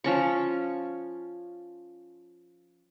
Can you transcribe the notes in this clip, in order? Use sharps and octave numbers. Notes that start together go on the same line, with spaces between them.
F3 C#4 C#6